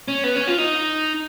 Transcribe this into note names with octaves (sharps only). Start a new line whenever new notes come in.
C#4
B3
C#4
F4
D#4